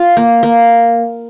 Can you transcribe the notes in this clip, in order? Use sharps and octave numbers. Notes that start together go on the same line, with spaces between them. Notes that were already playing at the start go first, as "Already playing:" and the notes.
Already playing: F4
A#3
A#3